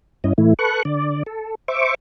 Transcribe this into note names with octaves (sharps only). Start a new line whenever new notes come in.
G2 C#4 E4 D#5
A2 E3 A3 E4
A4 B4 C#6 F#6
D3 D5
A4
C5 E5 C#6 D6